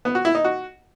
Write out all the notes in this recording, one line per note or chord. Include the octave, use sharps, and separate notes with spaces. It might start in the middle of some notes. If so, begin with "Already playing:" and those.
B3
F#4
E4
D#4
F#4